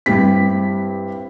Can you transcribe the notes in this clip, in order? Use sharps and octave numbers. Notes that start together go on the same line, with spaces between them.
G2 C4 E4 G4 B6